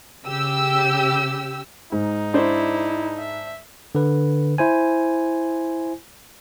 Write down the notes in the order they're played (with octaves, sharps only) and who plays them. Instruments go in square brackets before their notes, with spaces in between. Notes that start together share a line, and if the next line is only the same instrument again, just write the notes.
[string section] C#3 G4 E6
[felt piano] G#2 [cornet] D#4
[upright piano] D4 C5 D5 [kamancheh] E4
[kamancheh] E5
[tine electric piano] D3 B4
E4 C5 G#5